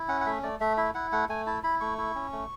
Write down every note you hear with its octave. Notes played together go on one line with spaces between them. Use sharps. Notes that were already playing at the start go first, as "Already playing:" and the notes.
Already playing: E4
C#4 F#5
F#5
A3 E5
A3 D5
A3 E5
E4 E5
E4 F#5
A3 F#5
A3 G#5
E4 A5
E4 B5
A3 C#6
E4
C#4
A3